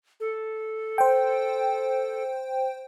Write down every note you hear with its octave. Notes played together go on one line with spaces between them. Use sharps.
A4
C5 G5